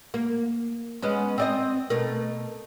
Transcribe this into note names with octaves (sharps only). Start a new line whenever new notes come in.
A#3
G#3 B3 C#4
C4 D5 D#5
B2 A3 A#4